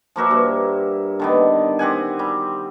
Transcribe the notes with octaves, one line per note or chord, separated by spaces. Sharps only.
F3 A#3 F#4 E5
G2
D3 D#3 B3
C4 G4 F#5 G#5
G3